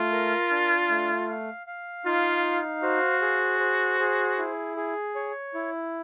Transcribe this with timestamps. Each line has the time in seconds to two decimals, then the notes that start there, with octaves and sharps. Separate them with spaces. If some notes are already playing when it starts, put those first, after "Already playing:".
Already playing: A3 F4
0.12 A#4
0.50 D4
0.89 A3
1.29 F5
1.67 F5
2.05 D#4 F4
2.44 F5
2.83 F#4 C5
3.22 G#4
3.60 C5
4.00 G#4
4.38 E4
4.77 G#4
5.15 C#5
5.54 E4